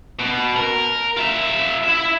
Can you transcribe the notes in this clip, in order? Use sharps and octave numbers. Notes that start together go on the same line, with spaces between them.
B2
A#4
F4 E5
E4 E5